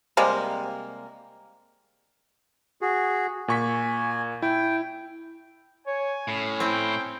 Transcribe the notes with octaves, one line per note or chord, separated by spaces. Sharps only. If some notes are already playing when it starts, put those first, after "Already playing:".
C3 G3 G#3 A#3
F#4 G#4
A#2 G#5 C#6 B6
E4 G5
C#5 G#5
A2 C#4
C4 E4 G5